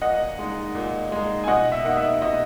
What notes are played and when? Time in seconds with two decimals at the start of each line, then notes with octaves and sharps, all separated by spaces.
0.02 A#2 D#5 F#5
0.39 G#3 D#4
0.75 A#2
1.12 G#3 D#4
1.44 G#5
1.48 B2 D#5 F#5
1.72 E5
1.84 A#3 D#4 F#5
1.97 E5
2.22 B2 D#5